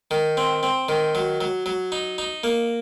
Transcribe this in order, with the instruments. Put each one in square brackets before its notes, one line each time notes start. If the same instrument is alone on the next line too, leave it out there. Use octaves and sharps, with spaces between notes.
[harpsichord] D#3
C4
C4
D#3
F#3
F#3
F#3
D#4
D#4
A#3